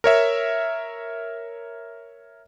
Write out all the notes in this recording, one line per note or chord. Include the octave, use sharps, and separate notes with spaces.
A#4 C#5 E5